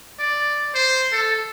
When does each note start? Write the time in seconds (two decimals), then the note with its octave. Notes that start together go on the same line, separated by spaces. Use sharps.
0.19 D5
0.74 C5
1.12 A4